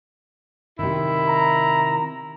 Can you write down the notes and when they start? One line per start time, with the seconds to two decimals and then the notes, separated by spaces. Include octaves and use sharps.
0.79 C3 D#3 E4
1.28 A#5